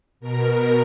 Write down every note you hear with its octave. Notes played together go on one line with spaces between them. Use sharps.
B2 A#4